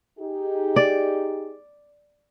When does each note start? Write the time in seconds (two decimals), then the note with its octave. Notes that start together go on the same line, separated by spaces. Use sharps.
0.19 D#4 G4 G#4
0.76 D5